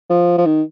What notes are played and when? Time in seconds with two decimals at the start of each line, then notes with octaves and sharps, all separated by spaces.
0.10 F3
0.38 F3
0.46 D#3